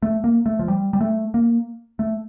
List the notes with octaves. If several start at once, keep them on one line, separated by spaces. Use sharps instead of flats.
A3
A#3
A3
F3
G3
G3
A3
A#3
A3